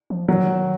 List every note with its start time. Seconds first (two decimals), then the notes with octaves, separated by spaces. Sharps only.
0.10 F3
0.28 D#3 F#3